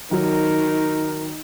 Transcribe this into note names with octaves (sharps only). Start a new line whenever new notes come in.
D#3 F#3 D#4 A#4